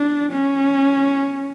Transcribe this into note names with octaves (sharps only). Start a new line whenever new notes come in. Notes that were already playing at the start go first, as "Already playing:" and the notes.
Already playing: D4
C#4